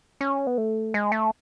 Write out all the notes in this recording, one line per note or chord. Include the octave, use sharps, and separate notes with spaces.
C#4
B3
A3
G#3
A3